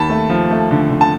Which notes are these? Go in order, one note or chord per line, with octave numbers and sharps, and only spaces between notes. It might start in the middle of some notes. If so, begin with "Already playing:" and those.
Already playing: D#2 A5 B5
A3
F3
A3
D3
D3
A5